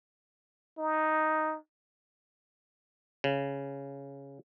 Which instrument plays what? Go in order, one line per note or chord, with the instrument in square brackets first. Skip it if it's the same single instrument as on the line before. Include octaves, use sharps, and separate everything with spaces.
[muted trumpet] D#4
[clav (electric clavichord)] C#3